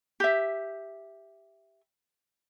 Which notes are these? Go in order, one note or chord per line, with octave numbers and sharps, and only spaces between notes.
G4 E5